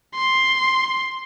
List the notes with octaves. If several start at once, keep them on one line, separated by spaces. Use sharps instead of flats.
C6